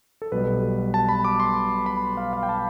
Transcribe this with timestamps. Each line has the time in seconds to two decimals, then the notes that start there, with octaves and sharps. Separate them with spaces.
0.22 A4
0.32 B1 B2 G3 B4
0.94 A5
1.09 B5
1.24 D6
1.40 C6
1.86 B5
2.17 F5
2.33 F5
2.43 G5
2.49 A5